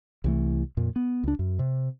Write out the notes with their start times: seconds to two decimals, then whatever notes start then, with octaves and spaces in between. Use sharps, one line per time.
0.24 C2 E3 A3
0.77 F2 A#2
0.96 B3
1.23 C#2 D4
1.39 F#2
1.59 C3